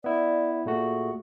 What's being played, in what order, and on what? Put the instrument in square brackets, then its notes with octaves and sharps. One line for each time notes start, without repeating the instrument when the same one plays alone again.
[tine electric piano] B3 E4 [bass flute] D5
[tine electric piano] A#2 A3 F#4 [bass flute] G#4